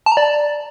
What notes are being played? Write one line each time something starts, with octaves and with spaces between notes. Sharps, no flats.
A5
A#5
D5